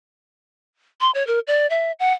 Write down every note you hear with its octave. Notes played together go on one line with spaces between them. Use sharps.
C6
C#5
A#4
D5
E5
F#5